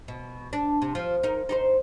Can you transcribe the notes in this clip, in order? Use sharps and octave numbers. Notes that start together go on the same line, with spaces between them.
B2
D4
C3
F3 F4
D#4 A#4
D#4 G4 C5